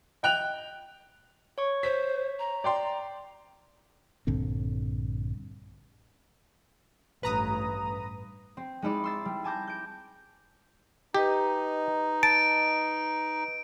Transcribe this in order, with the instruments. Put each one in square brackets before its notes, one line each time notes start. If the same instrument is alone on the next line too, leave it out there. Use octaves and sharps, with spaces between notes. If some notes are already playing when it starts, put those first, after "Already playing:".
[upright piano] D#5 G5 F#6 F7
[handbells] C#5 C#6
[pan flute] C5 [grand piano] B6
[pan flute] A#5
[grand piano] D5 G5 C6
[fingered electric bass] A#1 G2 D3 C4
[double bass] A1 G2 [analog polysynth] B4 A#5 D#6
[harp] C4
G#3 D#4 E4 D5 D7
C6 E6 A6
G3
G#5 A5 D6 G6 A#6
G6 D7
[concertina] D#4 [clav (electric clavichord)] G4 [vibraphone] B4 D#5 A#5
[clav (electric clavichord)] A5 [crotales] D7